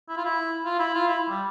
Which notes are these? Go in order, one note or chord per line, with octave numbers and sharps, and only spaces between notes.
E4
F4
E4
F4
E4
F4
E4
G3